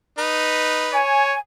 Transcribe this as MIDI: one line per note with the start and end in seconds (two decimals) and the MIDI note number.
0.18 0.98 63
0.18 0.98 71
0.93 1.36 73
0.93 1.38 80